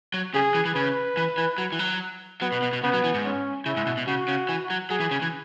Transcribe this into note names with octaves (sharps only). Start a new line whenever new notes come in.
F#3
C#3 G#4
E3
E3
C#3 B4
E3
E3
F#3
E3
F#3
F#3 B3
B2
B2
B2
C#3 B3
F#3
E3
G#2
C#4
C#3 E4
G#2
B2
B2
C#3 F#4
C#3
E3
F#3
F#3 G#4
E3
C#3
E3